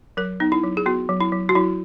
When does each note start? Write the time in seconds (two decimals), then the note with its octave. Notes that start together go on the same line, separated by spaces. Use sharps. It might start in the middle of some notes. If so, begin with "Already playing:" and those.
0.17 F#3 A#4
0.40 B3 D#4
0.52 E4
0.63 F#3
0.77 G#4
0.86 B3 F#4
1.09 F#3
1.20 E4
1.32 F#3
1.49 F#4
1.55 F#3 E4